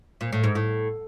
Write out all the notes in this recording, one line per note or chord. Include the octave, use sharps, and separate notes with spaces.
A#2
A2
G#2
A2